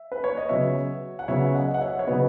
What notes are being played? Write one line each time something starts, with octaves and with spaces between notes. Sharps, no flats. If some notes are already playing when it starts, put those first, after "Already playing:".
Already playing: E5
B4
C#5
D#5
C#3 F#3 B3 C#5 E5
F#5
C#3 F#3 B3 C#5 E5
D#5 F#5
F#5
C#5 E5
C#5
C#3 F#3 B3 B4 D#5